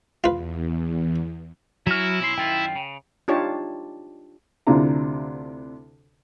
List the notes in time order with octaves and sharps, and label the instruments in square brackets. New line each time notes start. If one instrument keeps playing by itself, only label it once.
[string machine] E2 [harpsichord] F4 B4
[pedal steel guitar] F#3 F6 [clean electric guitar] C#4 F#4 [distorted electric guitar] E4
[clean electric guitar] B1 C#4 C6
[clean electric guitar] F#2 D#3 F4 [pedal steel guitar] G5
[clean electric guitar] C#3
[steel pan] D4 D#4 F4 G4 C#5 A5
[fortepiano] D2 C3 D4 E4 F4 A#5